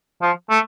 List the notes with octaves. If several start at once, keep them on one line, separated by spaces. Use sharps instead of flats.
F3
A3